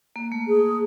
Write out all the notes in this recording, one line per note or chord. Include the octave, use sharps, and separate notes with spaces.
A#3
A3
G#4